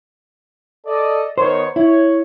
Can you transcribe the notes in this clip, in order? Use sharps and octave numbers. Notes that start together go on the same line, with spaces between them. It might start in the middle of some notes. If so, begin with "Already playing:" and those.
A4 D5 D#5
D#3 B3 C5 C#5
E4 C#5